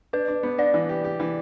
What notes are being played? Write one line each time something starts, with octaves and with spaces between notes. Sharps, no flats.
D4 B4
D4
B3
D4 D5
E3
G4
G4
E3